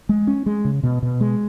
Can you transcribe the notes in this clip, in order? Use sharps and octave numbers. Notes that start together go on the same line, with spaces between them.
G#3
C#4
G#3
C#3
B2
B2
G#3